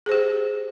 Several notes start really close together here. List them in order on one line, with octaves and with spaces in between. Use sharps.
G#4 C5 G4